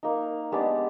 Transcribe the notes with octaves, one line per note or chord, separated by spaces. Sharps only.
A#3 D#4
G#3 B3 D4 G4